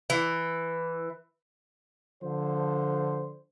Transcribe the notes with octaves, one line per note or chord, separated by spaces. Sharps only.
E3
D3 F3 C5